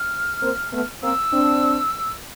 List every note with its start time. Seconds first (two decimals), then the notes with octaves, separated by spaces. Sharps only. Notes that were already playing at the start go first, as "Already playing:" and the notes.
Already playing: F6
0.42 A#3 C4
0.72 A3 B3
1.02 A#3 C4 E6
1.33 C4 D4